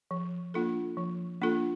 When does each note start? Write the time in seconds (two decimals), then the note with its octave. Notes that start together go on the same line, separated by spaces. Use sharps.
0.11 F3
0.54 A#3 D4 F4 A4
0.97 F3
1.41 A#3 D4 F4 A4